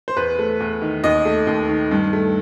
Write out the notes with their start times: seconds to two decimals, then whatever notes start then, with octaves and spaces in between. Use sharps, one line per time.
0.08 C5
0.17 E2 B4
0.39 A3
0.60 E2
0.82 D#3
1.04 D#2 D#5
1.25 A3
1.47 D#2
1.69 D#3
1.91 G2
2.13 A3